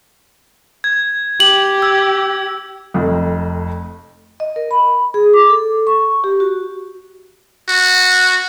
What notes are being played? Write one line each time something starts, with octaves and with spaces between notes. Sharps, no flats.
G#6
G4 F#7
E6 G#6
F1 F2
D#5
A#4
B5
G#4
D6
A4
C#6
G4
F#4
F#4